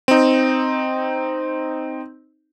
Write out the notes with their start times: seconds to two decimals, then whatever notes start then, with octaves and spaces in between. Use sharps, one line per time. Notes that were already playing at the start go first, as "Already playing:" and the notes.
0.08 C4 D#4